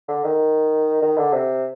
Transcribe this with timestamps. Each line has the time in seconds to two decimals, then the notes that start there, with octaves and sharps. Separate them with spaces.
0.08 D3
0.25 D#3
1.02 D#3
1.17 D3
1.33 C3